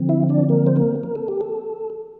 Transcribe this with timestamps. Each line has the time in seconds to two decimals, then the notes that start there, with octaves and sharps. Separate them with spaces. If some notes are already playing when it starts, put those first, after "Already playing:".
Already playing: D3 F3 C4
0.09 E4 E5
0.29 D4 D5
0.49 A#3 A#4
0.67 C5
0.76 A#3 A#4
1.03 A#4
1.15 A4
1.28 G4
1.41 A4